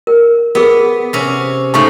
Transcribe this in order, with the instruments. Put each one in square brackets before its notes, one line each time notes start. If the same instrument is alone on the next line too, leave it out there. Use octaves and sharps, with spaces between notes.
[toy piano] A#4
[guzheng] B3 [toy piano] G#4 A#4
[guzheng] C3 C#4
[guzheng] G#2 C#3 A3 [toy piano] A5 C#6